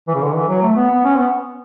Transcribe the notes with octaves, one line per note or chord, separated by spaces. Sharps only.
E3
C#3
D3
E3
F#3
A3
B3
B3
C#4
B3